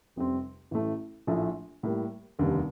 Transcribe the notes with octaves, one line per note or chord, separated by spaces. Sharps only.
F1 F2 C3 G3 C4
A1 A2 A3
A#1 A2 F3 A3
A2 G3 A#3
F1 D#2 D3 G3